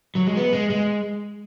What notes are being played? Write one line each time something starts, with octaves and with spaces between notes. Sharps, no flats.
F#3
G#3
B3
G#3
G#3